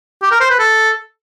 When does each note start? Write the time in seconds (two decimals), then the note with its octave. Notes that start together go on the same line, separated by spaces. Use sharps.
0.22 G4
0.31 A#4
0.41 C5
0.50 B4
0.59 A4